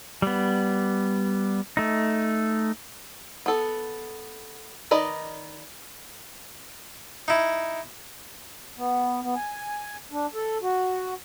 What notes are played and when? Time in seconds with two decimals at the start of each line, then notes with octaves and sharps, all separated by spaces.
0.22 G3 B3
1.77 A3 D#4
3.46 B3 A4
4.91 D#3 B4 D5 D#5
7.28 D#4 E4
8.77 B3
9.22 B3
9.36 G#5
10.11 D4
10.34 A4
10.62 F#4